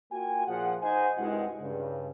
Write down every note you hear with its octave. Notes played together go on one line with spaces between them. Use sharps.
A#3 F4 F#4 G5 G#5
A#2 F3 G#4 F#5
D#4 C5 D#5 F#5 G#5
C2 G2 G#3 E4 F#4 F#5
G2 C#3